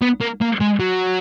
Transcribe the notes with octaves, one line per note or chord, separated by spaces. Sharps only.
B3
A#3
A#3
G#3
F#3